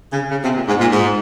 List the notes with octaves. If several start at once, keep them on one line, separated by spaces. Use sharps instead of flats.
C#3
C#3
C3
A#2
G#2
A#2
G#2